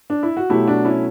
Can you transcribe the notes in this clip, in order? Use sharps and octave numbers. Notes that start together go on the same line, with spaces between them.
D4
E4
F#4
B2 F#3 A3 E4 G4
D4 F#4
C#4 E4